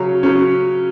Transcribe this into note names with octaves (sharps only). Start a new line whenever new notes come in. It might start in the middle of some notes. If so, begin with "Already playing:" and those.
Already playing: C#3 F#3 C#4
C#3 F#3 C#4